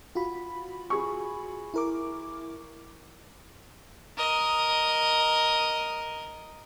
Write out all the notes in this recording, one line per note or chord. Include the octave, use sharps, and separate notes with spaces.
F4 F#4 B5
G#4 C#6
E4 A#4 D6
A#4 D#5